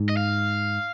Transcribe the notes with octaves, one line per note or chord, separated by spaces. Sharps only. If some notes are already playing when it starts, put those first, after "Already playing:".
Already playing: G#2
D#5
F5